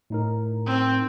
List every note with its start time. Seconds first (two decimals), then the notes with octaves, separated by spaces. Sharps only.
0.10 A2 D#4 A#4
0.66 C4